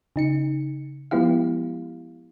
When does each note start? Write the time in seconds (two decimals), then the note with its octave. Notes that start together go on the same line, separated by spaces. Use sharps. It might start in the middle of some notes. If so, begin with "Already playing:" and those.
0.16 C#3 D#4 C#7
1.11 F3 G#3 B3 E4 G4 F5